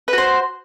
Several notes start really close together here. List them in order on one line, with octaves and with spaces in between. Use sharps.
B4 F#4 C5